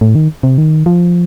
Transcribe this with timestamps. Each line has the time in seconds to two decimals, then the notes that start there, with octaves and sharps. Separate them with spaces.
0.01 A2
0.15 D#3
0.43 C3
0.58 D#3
0.86 F3